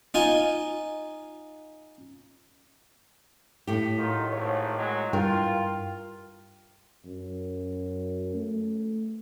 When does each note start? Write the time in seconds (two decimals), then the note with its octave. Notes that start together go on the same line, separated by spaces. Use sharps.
0.14 D#4 F4 G#5
3.67 A2 G4
3.99 D#3 F#3 F4
4.33 G#1 C#5
4.79 F#3 G#3
5.13 G2 F4 A#4 G5
7.05 F#2
8.35 A3